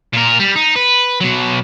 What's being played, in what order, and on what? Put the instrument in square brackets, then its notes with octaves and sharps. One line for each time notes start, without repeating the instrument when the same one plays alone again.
[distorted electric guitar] A#2 A#4
G3
D#4
B4
B2 F#3